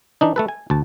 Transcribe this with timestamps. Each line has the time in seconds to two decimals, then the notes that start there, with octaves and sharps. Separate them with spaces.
0.21 E3 D4 D#4
0.36 A3 A4 B4
0.48 G#5
0.70 D2 A5